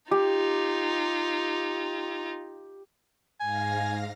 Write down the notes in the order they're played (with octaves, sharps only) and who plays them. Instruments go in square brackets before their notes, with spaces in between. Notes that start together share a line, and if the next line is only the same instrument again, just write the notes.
[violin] D#4 F4 [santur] G4
[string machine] G#2 F5 A#6 [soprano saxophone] G#5